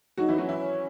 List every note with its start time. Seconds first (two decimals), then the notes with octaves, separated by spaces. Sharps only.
0.17 F#3 D#4 F#4
0.29 E3 E4
0.38 F#3 C#4 F#4
0.48 E3 E4
0.58 C#4